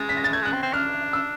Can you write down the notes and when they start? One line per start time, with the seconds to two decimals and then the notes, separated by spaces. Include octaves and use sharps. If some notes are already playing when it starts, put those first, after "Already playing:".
Already playing: G#3 A6
0.09 B6
0.17 A#6
0.24 A6
0.33 A3 G#6
0.42 G#3 F#6
0.53 C4
0.63 C4
0.74 D4 F6
1.13 E6